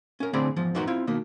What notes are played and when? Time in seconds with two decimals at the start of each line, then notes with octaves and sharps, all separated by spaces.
0.20 C#4 A#4
0.33 A2 D3 C4 G#4 D5 B5
0.56 E2 G#2 F3
0.75 E2 G#2 D#4 F#4 A#4 C6
0.87 C4 E4 F4
1.07 B2 D#3 A#3 B3